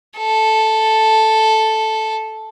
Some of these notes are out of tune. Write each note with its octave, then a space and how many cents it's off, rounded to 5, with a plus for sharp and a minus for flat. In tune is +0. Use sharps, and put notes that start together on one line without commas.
A4 +0